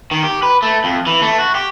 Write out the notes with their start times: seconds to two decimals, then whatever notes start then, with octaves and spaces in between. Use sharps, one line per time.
0.11 D#3
0.23 G4
0.43 B4
0.62 A3
0.84 F2
1.07 E3
1.22 A3
1.38 F#4
1.55 G4